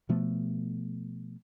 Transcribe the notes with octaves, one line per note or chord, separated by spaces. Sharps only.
B2 F3 A3 B3